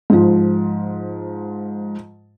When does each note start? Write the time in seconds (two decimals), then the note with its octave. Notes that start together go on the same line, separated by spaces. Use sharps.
0.10 G#2 F3